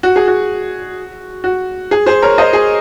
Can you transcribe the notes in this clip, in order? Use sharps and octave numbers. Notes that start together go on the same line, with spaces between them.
F#4
G#4
F#4
F#4
G#4
G#4 C5
A#4 C#5
C5 D#5
G#4